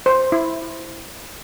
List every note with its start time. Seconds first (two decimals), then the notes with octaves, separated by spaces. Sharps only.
0.06 C5
0.32 E4